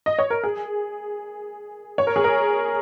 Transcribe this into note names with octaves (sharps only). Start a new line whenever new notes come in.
D#5
C#5
A#4
G#4
C#5
A#4
G#4
A#4